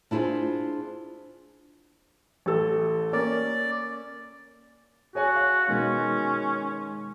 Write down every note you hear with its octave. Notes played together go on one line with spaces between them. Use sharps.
D4 E4 F4 G#4 C5
A1 A4
A#3 C#4 A#4 D5
F#4 G#4 C#5 G#5
F5
B2 D#3 G#3 C#4